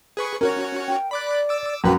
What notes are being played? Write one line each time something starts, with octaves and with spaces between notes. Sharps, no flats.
G#4 B4 C#6
C#4 F#4 A#4 C#5
G5
D5 B5 D6 F#6
D6 E6
A1 F#2 F#4 B4 G5